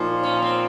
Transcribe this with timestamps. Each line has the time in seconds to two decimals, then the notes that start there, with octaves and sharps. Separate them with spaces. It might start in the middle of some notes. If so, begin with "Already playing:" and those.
Already playing: A#2 F3 A#3 D#4 F4
0.23 C#4
0.42 C4